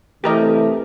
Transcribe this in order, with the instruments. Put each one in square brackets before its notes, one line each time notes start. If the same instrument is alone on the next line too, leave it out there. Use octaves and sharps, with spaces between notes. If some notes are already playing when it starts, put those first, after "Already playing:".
[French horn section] C3 E3 A3 [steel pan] G4 A#4 D#5